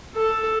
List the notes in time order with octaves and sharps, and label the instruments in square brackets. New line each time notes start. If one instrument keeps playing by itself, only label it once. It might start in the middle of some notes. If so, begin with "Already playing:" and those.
[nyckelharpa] A4